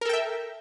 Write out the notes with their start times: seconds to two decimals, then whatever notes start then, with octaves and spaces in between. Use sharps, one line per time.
0.01 A#4
0.05 A4
0.09 G5
0.13 E5